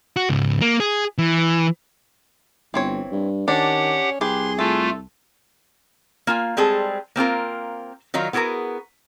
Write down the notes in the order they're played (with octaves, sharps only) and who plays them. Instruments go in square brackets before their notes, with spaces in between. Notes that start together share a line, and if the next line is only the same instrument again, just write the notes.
[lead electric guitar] F#4
C#2 G#2
A#3
G#4
E3
[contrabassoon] G1 [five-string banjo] E3 C4 C#5
[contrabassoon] G2
[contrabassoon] D#3 [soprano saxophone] C#4 [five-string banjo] D4 [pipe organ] G4 F#5
[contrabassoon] C2 [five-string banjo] G4 B4 [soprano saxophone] G#4 [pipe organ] C6
[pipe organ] A3 F4 [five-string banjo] A4
[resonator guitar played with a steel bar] A#3 F4 G#5
G3 G#3 C4 G#4 A4
A#3 C4 F4 A#4
D#3 F#3 D#4 F4
B3 E4 F#4 G#4 A#4